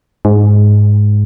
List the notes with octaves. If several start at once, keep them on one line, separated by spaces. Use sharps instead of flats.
G#2